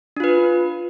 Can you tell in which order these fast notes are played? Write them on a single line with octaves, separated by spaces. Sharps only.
D4 F4 B4